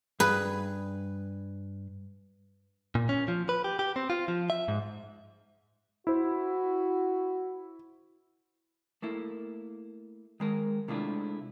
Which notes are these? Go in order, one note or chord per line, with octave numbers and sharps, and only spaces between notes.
G2 G#4 B4
A#2
C#4
F3
B4
G4
G4
C4
F4
F3
E5
G#2
E4 F#4 C5
A3 A#3 E4
D#3 G#3 A#4
C3 G#3 A3 D4 E4 F4